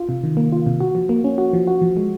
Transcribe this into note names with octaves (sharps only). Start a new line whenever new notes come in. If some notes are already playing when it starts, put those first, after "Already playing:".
Already playing: F4
C3
D#3
A#3
F4
C3
F#4
F3
A#3
C#4
F#4
F3
F#4
F3
G#3